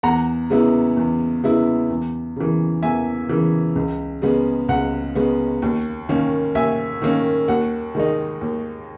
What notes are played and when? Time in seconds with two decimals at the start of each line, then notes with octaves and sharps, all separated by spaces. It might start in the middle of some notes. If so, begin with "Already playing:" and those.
0.03 E2 F#5 A#5
0.50 C#3 G#3 B3 E4
0.97 E2
1.44 C#3 G#3 B3 E4
1.90 E2
2.36 C#3 E3
2.83 E2 E5 G#5
3.29 C#3 E3
3.76 C#2
4.22 C#3 G#3 B3
4.69 C#2 F#5
5.15 C#3 G#3 B3
5.62 D#2
6.09 D#3 A#3 C#4
6.55 D#2 E5 G#5
7.02 D#3 A#3 C#4
7.48 D#2 F#5
7.95 D#3 G#3 D#4
8.41 D#2